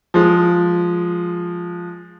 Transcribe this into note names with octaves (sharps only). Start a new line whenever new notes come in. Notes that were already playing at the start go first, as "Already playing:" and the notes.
F3 G#3